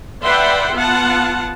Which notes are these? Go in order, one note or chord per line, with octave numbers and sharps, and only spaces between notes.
B4 D5 E5 F#5 G5 C6
B3 F4 F#5 A5